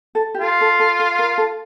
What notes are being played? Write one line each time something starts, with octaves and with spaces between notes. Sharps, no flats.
A4
G4
F4 A4
A4
A4
A4
A#4
A4